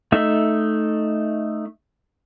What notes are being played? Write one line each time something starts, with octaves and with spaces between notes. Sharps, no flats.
A3 D#4 E5